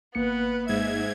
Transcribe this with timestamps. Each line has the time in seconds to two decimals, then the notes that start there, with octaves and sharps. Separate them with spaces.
0.15 G#1 A#3 B3 B4 C#7
0.68 G#2 E5 G#6